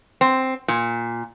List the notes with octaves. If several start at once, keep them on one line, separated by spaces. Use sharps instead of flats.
C4
A#2